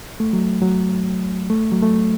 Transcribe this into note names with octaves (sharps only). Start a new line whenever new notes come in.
A3
F#3
F#3
A3
F#3
A3